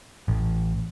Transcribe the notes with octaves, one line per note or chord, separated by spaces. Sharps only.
A1